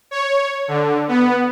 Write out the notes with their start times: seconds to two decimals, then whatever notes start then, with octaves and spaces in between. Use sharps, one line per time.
0.11 C#5
0.68 D3
1.08 B3